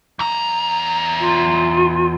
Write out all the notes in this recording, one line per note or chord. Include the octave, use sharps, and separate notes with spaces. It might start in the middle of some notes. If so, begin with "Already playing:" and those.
E2 A#5
F4